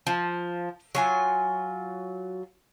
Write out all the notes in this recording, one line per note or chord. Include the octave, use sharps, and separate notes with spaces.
F3
F#3 F4 G#5